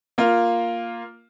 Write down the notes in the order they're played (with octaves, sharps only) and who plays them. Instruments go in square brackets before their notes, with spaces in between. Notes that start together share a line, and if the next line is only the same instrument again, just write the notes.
[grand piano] A#3 F4